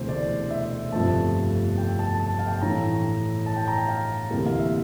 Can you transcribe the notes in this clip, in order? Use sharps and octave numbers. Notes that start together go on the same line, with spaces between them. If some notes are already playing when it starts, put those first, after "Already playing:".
Already playing: E1 D2 C3 E3 A3 C5
D5
E5
G1 F2 C3 F3 A3 A5
G5
A5
A5
F5
G5
A5
A2 E3 A3 A#5
A5
G5
A#5
G5
F5
D2 C3 E3 G3 A#3
F5
E5